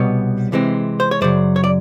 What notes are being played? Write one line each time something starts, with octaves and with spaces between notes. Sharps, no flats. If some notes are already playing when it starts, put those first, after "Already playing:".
Already playing: C2 B2 G3 B3 C#5 D#5
C3 E3 G#3 C4
C5
C#5
F#2 C#3 F#3 C5 D5
C#5
D5